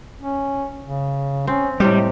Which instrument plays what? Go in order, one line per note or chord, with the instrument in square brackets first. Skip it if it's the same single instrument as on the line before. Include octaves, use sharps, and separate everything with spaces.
[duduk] C#4
C#3
[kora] C4 [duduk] C#4
[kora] A2 C3 G4 [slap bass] G3 [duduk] G#3